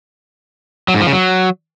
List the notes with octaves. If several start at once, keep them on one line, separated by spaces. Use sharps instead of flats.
F#3
G#2
F3
C#3
F#3